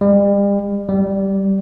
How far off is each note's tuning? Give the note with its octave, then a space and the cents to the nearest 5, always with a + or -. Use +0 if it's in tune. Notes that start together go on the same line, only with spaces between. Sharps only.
G3 +40
G3 -10